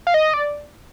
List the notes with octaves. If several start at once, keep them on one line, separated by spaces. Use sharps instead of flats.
F5
D#5
D5